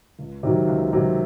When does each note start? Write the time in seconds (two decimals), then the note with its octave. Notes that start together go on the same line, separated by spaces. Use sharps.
0.19 C#2
0.43 C3 D#3 F#3
0.67 C#2
0.93 C3 D#3 F#3